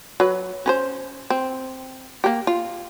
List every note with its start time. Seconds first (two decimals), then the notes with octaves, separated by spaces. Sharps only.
0.20 F#3 B4
0.66 C#4 B4 C5
1.30 C4
2.24 A#3 G4
2.47 F4